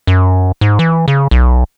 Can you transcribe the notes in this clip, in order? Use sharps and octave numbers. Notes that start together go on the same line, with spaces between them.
F#2
G#2
E3
C#3
B1